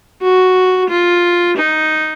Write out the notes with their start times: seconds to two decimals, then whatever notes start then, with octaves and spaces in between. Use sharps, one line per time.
0.21 F#4
0.89 F4
1.56 D#4